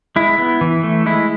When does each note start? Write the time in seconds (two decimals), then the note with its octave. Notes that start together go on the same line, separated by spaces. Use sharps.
0.16 G#3 E4
0.38 B3
0.61 E3
0.83 A3
1.06 G#3 E4